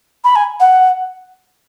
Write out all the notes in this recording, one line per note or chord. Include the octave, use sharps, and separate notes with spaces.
B5
G#5
F#5